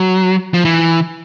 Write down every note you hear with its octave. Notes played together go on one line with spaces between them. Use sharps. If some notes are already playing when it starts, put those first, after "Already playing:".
Already playing: F#3
F3
E3